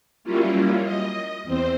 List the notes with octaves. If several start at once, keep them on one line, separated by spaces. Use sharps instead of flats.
F#3 G3 A#3 C#4 E4 F4
D#5
E2 C4 C5